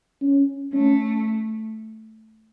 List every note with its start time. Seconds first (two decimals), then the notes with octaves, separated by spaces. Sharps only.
0.22 C#4
0.73 A3 C#4